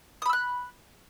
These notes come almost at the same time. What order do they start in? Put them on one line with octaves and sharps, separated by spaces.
D#6 B5 E6 F#6